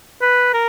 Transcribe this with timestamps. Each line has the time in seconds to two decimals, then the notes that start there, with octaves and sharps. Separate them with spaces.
0.22 B4
0.54 A#4